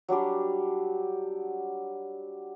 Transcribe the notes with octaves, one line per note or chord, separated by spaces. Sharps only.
F#3 G3 D4 G4